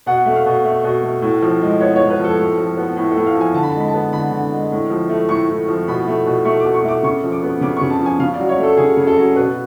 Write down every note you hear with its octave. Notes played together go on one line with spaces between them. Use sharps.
B2 F#5
A3
F5
B2
A3
B2
A3
A2
F3
G#3
B3 C#5
A2 C#5
B4
F3 A4
A2
F3
B3
A2
A4
A2
F5
F3
G#5
D3 A5
B5
G#3 A5
B5
A5
B3
D3 B5
D3
G#3
A2
F3
A3
A2 C#6
A2
F3
B2 B5
A3
B2
A3 C#6
D6
B2
C#6
A3 D6
C#3 C#6
F3
D6
B3
C#3 D6
C#3 C#6
A5
F3
G#5
C#3 F5
D5
F#3
C#5
A3
A4
C#3 G#4
C#3
A4
F#3
B2 B4